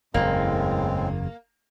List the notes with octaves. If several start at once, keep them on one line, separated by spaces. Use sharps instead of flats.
F#1 E2 A2 G#3 A#3 C4